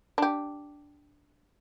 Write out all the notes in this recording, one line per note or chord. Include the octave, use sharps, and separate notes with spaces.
D4 G4